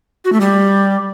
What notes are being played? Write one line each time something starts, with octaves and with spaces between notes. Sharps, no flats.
F#4
A3
G3